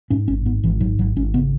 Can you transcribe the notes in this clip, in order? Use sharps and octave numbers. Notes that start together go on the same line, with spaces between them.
G#2 C#4
G#1 C#4
G#2 B3
G#1 E3
G#2 F#3
G#1 F#3
G#1 C#4
C#3 B3